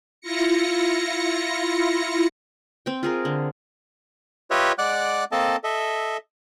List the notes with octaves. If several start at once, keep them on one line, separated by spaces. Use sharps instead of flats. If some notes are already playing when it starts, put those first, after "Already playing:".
E4 F4 A#6 C#7
C4 G5
F4 G#4 A#4
D3
F4 G4 B4 C#5 D#5 E5
G#3 D5 F#5 D6 F#6
A#3 C4 A4 D#5 A5
A4 D#5 E5